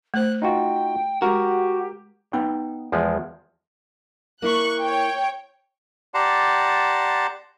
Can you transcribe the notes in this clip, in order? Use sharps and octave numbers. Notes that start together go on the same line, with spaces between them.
A3 C5 F#6
D#4 F4 F#4 G5
G#3 F#4 G4 A#4
B3 D#4 G5
E2 F3 G#3
A#3 E4 C#6 F#6
C#5 G5
G4 D5 F#5 A5 A#5 C6